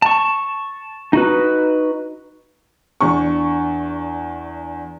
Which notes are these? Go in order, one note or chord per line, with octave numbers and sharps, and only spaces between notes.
A5 C#6
D#4 F#4 B4
E2 D4 C#6